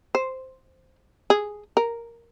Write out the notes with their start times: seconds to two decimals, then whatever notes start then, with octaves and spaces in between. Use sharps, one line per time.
0.15 C5
1.30 G#4
1.77 A#4